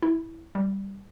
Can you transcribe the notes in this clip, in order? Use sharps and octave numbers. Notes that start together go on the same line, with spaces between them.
E4
G3